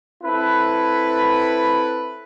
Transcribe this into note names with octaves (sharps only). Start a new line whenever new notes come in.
C4 E4 A4 B4